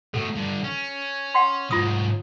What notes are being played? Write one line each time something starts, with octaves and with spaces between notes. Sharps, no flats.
B2 A3 A4
G2 D3
C#4
F#5 G5 C6
G#2 F#3 F4 D#6